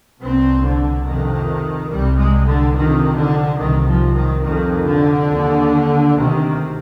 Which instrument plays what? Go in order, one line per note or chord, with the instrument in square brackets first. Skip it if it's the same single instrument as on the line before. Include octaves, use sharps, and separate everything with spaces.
[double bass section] C2 B2 C4
D3
F2 C3 D#3
C2 C3 G3
G#3
D3
F2 C3 D#3
D3
C2 C3 D#3
F3
D#3
F2 C3 D#3
D3
D#2
D2 C3 D#3